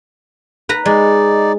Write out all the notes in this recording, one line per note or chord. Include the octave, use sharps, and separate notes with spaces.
B4 A#5
G#3 D#4 D5